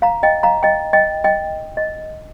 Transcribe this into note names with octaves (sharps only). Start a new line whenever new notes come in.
F5 A#5
D#5 G5
F5 A#5
D#5 G5
D#5 G5
D#5 G5
D#5